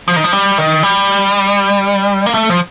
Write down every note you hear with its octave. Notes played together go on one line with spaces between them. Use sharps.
F3
D#3
F3
G3
D#3
G3
A#3
A3
F3